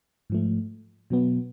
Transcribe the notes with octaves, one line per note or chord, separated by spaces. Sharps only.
G#2 F3 A3
B2 F#3 B3